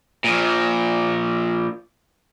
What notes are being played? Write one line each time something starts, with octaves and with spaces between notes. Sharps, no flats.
A#2 F3